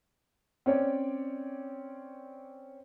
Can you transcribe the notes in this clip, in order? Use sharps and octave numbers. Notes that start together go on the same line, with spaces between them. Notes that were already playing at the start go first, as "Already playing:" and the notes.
C4 C#4 C#5 D5